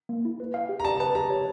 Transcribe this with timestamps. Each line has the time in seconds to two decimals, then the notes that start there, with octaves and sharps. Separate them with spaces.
0.09 A#3
0.25 E4
0.40 B4
0.54 F5
0.69 G4
0.80 A#5
0.85 D5 A5
1.00 B4 A5
1.15 G4 A#5
1.30 C#5